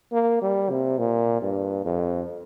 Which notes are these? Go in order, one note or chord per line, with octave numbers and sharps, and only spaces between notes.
A#3
G3
C3
A#2
G2
F2